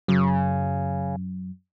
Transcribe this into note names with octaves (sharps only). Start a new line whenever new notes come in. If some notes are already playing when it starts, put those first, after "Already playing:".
F#2 C#3